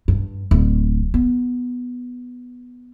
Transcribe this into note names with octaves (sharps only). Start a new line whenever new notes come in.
G2
D1
B3